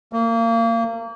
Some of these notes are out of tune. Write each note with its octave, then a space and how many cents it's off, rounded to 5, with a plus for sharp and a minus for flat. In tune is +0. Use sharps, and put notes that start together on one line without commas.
A#3 -30